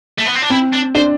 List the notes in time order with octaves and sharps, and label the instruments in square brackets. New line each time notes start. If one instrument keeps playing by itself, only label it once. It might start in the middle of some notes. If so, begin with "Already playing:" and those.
[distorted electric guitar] A3
B3
C4
D4
[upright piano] C4 [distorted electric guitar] E4
[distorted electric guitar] D4
[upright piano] D4 [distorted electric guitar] C5